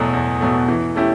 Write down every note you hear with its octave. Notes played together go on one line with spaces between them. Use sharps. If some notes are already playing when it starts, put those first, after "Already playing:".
Already playing: E2 B2 F#3 A3
E2
B2 F#3 A3
E3
A3 C#4 E4 G4